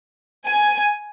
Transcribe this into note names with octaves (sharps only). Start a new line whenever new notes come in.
G#5